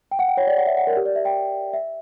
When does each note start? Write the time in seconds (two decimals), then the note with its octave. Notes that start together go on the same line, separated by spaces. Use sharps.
0.11 G5
0.19 F#5
0.29 G5
0.37 C#5
0.47 D5
0.58 F#5
0.67 E5
0.77 F#5
0.87 A#4
0.97 G4
1.05 D5
1.16 E5
1.25 G5
1.73 E5